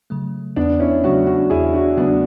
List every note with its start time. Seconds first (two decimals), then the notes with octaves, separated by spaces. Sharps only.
0.10 C#3 F#3 A3
0.56 E2 B3 D4
0.80 C#4 E4
1.04 C#3 F#3 A3 D4 F#4
1.27 D4 F#4
1.50 E2 E4 G#4
1.73 D4 F#4
1.97 C#3 F#3 A3 B3 D4